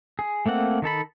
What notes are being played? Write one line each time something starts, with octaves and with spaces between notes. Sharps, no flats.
G#4
A3 A#3 C4 F#5
D#3 D#4 A4 B5